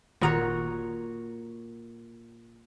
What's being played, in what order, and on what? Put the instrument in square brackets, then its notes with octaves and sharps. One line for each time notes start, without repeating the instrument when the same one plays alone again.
[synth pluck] G1 D#3 A#5 [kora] A#2 F#4 C#5